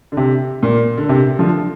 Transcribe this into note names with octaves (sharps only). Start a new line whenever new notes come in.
D3
C3
A#2
D3
C3
D3 F3